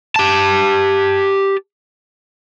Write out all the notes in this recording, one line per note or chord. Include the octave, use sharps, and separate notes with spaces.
G4 A5